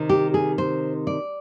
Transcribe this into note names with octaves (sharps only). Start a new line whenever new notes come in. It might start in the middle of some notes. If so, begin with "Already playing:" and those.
Already playing: C3 D#3
G4
G#4
C5
D5